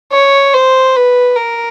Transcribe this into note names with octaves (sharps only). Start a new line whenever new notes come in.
C#5
C5
B4
A#4